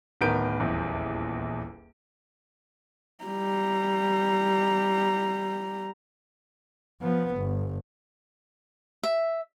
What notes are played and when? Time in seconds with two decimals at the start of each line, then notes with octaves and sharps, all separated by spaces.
0.21 D1 D#3 B3 A#4 G6 D7
0.60 D#1 A#1 E2
3.24 G3 A#5
7.01 F3 B3
7.36 G1
9.03 E5